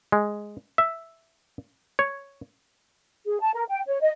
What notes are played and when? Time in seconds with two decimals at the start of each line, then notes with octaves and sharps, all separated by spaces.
0.12 G#3
0.78 E5
1.99 C#5
3.26 G#4
3.40 A5
3.54 A#4
3.70 G5
3.86 C#5
4.01 D#5